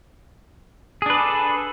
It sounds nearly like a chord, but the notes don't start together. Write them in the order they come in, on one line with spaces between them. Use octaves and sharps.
G#4 D4 B4 D5 A4